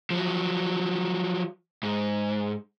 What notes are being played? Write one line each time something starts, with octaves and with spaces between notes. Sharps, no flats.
F3 F#3
G#2